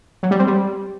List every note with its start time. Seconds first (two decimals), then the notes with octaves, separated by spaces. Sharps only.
0.23 F#3
0.31 G3
0.39 C4
0.47 G3